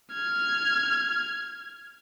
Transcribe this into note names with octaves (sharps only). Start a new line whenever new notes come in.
F6 G#6